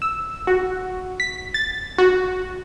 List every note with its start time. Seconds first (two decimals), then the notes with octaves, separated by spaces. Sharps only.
0.02 E6
0.47 F#4
1.20 B6
1.54 A6
1.98 F#4